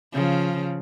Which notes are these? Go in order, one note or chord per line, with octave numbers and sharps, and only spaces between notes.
C#3 F3